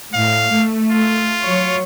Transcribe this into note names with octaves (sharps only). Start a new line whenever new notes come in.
A2 F5
A3
F4
F#3 C#5